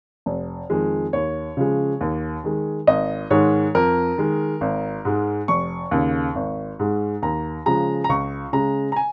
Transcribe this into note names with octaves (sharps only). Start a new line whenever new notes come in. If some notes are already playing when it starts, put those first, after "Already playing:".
F1
F2 D#3 G#3
D#2 C#5
C#3 F3 G#3
D#2
D#3 G#3
G#1 D#5
G#2 D#3 G#3 C#5
F2 A#4
D#3 G#3
G#1
G#2 G#3
F1 C#6
D#2 C#3
G#1
G#2 G#3
D#2 A#5
C#3 F3 G#3 A#5
A#5
C#2 C#6
C#3 G#3 A#5
A#5
G#5